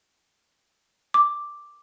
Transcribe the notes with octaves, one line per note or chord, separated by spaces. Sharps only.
D6